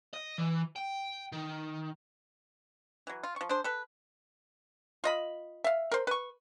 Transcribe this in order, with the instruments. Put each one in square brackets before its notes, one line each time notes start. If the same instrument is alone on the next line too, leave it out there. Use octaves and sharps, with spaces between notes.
[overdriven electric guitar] D#5
E3
G5
D#3
[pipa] E3 F#3
F4
F3 C#6
D4 G#4 C5
A4 B4
F4 D#5 B5
E5 F5
A#4 C5
B4 C#6